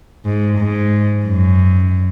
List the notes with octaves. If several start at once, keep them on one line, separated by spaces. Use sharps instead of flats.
G#2
G#2
F#2